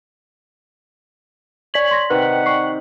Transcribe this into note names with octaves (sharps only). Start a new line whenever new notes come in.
C#5 D5 B6 F#7
C6 A#6
C3 D#3 B4 F#5
C#6 C7